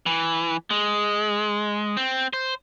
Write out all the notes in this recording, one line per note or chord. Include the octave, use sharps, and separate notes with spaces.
E3
G#3
C4
C5